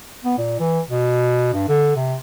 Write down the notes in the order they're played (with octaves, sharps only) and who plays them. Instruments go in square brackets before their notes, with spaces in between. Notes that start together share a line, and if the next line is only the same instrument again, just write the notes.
[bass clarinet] B3
A#2
E3
B2
G2
D3
C3